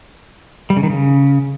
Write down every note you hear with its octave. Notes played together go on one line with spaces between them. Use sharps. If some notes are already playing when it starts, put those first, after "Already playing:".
G3
C#3
D#3
C#3